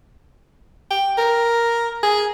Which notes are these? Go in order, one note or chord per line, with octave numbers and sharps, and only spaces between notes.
G5
A#4
G#4